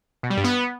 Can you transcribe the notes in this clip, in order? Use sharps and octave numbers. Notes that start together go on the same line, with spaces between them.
B2
G3
G2
B3